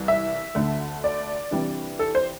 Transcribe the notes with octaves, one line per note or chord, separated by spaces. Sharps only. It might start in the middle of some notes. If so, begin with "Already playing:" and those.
Already playing: C2 E3
E5
D2 D3 A3
D5
C3 E3 G3 D4
A4
C5